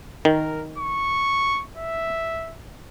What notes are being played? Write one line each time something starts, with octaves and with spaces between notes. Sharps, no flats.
D#3 A#4
C#6
E5